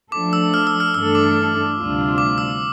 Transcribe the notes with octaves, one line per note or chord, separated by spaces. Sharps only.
F3 A3 D4 A4 D6
E6
F6
E6
F6
G2 E3 A3 D4 A4 E6
D6
D2 C3 G3 D4 F4
D6
E6